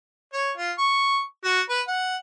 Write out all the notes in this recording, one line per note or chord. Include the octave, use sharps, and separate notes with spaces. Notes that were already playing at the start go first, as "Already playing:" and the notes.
C#5
F4
C#6
F#4
B4
F#5